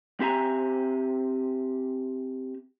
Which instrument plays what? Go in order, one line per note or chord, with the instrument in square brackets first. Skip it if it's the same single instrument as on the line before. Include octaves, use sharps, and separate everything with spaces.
[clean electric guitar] C4 G4 E5 G#5 A#5